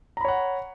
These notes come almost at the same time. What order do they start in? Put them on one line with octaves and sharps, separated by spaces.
A#5 B5 C#5 F#5